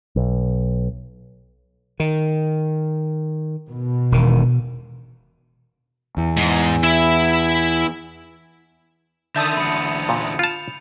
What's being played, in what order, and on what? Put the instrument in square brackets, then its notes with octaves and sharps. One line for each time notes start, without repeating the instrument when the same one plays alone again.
[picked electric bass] B1
[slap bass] D#3
[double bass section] B2
[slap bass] E1 D#3
[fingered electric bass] E2
[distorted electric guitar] G#2
E4 E5
[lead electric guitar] D3 D#3 [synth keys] E5 A5 D#6 [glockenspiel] G6
[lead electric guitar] E2 D3 [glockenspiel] B5 C#7
[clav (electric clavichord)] A#2
[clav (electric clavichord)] F4 A5 [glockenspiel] F7